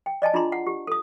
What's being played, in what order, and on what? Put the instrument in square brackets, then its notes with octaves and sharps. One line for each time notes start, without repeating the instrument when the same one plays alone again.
[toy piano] G5
D5 D#5 G#5 A5
D4 E4 F4 G#4 A#5 C6
F#5
G4
A4 D#6